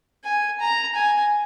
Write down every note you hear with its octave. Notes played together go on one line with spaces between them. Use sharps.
G#5
A#5
G#5